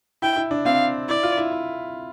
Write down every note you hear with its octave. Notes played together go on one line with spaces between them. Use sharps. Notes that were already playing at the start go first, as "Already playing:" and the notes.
E4 G5
E4
D4
C4 F5
E4 D5
F4
E4
E4